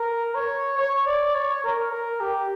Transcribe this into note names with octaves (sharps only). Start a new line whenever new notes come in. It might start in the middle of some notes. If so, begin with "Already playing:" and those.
Already playing: A#4
C#5
C#5
D5
C#5
A#4
A#4
G4